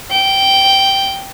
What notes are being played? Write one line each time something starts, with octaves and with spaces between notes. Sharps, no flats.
G5